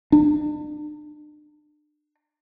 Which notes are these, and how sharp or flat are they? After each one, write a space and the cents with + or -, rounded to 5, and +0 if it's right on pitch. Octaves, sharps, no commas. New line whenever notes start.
D4 +35